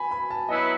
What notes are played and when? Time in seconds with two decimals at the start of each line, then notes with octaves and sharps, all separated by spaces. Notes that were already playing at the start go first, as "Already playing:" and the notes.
Already playing: G#5 B5
0.11 B5
0.30 A5
0.48 F#3 B3 E4 B4 D#5